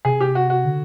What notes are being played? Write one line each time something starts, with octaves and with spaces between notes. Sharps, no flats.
C3 G#4
G4
F#4
F#4
D3